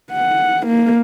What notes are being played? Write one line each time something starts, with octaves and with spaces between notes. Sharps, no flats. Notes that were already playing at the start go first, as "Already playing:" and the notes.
F#5
A#3